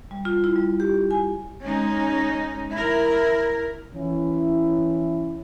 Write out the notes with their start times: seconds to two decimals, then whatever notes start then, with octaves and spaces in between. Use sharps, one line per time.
0.11 G3
0.25 F4
0.44 E4
0.56 G3
0.80 G4
1.11 G#5
1.61 G#3 C#4 D#4
2.73 E4 A#4
3.95 E3 C#4 E4